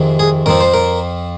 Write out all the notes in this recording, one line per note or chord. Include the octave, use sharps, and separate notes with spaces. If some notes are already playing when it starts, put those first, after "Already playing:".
Already playing: F2 C3 D#3 G#3 C4
G#4
F2 F3 C4 A#4
C5
A#4